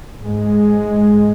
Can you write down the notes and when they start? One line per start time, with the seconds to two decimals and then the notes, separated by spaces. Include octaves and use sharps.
0.22 G#2 G#3